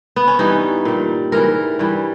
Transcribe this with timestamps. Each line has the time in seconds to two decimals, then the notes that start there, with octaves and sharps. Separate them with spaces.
0.16 B3
0.27 C#4
0.39 G2 E3 G3 D#4
0.85 A#2 G3
1.32 G#2 E3 G3 A#4
1.79 G2 E3 G3